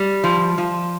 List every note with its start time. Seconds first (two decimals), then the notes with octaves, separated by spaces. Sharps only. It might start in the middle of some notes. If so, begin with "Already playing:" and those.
Already playing: G3
0.24 F3
0.58 F3